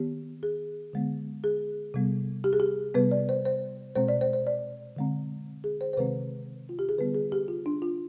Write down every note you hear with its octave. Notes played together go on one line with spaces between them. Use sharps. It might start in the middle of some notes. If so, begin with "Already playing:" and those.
Already playing: D#3 B3 G4
G#4
D3 G#3 B3
G#4
C3 G3 B3
G4
G#4
G4
C3 G3 B3 B4
D5
C5
C5
B2 G#3 C4 C5
D5
C5
C5
D5
D3 G#3 C4
G#4
C5
C5
C3 D#3 G#3 C4 B4
F4
G4
G#4
D3 G3 B3 B4
G#4
G4
F4
D4
F4